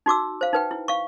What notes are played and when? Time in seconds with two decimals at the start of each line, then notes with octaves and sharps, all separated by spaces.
0.06 D#4 F#4 D6 E6
0.41 C5 F5
0.53 D#4 B4 G5
0.71 E4
0.88 F5 C#6